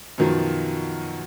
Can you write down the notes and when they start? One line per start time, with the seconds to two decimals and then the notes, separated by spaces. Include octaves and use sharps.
0.18 F#2 B2 D#3 F3